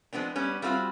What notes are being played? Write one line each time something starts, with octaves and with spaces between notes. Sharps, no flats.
F3 G#3 B3 C4 D4
G3 B3 C#4
G3 A3 C4 F4 F#4